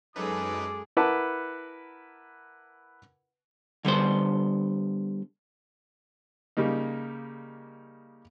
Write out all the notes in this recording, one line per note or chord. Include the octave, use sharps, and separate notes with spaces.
F#2 G#3 C#4 D#4 G#4 A4 B4 D6
E4 A#4 B4 F#5 A5 D6
D3 G3 B3 C5
C#3 G3 A#3 D#4